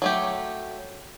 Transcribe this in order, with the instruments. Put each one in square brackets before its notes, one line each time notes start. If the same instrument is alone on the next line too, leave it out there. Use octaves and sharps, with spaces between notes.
[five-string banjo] F#3 A3 G4